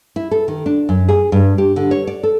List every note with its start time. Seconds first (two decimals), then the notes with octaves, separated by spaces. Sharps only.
0.16 E4
0.31 A4
0.48 D#3
0.66 D4
0.89 F#2
1.09 G#4
1.32 G2
1.58 G4
1.76 D3
1.91 C#5
2.07 D5
2.23 A4